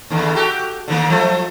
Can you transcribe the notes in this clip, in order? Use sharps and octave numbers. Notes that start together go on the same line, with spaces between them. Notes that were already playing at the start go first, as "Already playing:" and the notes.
D#2 D3 E3
F#4 G4 A4
D3 D#3 A#3
F3 F#3 A3